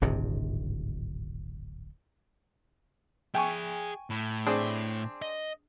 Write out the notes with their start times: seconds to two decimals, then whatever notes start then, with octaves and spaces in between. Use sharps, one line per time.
0.01 D1 G#1 G2 C3
3.35 G#4 E5 G5 G#5 C#6
4.10 A2
4.46 C4 D4 G#4
5.22 D#5